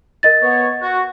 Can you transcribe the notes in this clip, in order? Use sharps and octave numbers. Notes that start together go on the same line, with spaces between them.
A#4 D#5 A6
B3 C#5
F#4